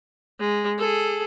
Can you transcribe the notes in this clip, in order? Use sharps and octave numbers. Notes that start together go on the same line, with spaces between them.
G#3
G#4 A4